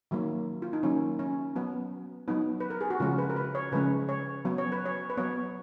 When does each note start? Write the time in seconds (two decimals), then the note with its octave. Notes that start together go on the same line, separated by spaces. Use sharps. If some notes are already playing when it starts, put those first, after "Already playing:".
0.11 D#3 F#3 A#3
0.62 F4
0.73 D#4
0.83 D#3 F#3 A#3 C#4
1.19 C#4
1.56 F#3 B3
2.28 F#3 B3 D#4
2.60 B4
2.70 A#4
2.81 G#4
2.90 F#4
3.00 C#3 F3 G#3 C#4 F4
3.18 B4
3.30 A#4
3.36 B4
3.55 C#5
3.72 C#3 F3 G#3 C#4 B4
4.09 C#5
4.45 F#3 B3
4.58 C#5
4.72 B4
4.86 C#5
5.10 B4
5.17 F#3 B3 C#5